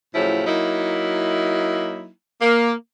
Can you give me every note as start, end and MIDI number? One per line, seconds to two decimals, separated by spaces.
0.14 0.46 45
0.14 0.46 49
0.14 0.46 53
0.14 0.46 54
0.14 0.46 64
0.47 2.09 54
0.47 2.09 58
0.47 2.09 63
0.47 2.09 64
2.42 2.72 58